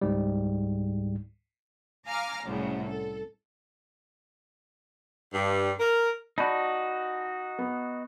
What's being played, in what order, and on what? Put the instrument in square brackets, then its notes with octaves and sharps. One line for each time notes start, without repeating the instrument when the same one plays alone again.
[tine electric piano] C#2 G#2 G3
[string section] F5 G#5 A#5 D6 F6
C2 F#2 A2 C#3
A4
[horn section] G2
A#4
[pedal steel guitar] D#4 F#4 [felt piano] D5 A5 B5
[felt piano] B3